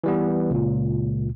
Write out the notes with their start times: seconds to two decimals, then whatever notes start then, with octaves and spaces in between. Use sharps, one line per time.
0.04 E3 G3 B3
0.51 C#2 A#2